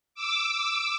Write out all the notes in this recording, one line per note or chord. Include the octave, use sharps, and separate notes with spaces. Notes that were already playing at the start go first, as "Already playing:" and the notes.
D6 E6